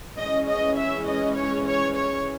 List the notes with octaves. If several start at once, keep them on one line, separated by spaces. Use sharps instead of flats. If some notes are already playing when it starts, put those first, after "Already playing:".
E3 G#3 C#4 D#5
D#5
E5
D#5
C#5
C#5
C#5